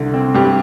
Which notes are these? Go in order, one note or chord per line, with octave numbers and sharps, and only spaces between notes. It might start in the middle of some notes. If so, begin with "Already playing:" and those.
Already playing: C2 D3
C4
G2 G4